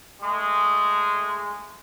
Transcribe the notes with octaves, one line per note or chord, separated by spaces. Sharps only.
G#3 A3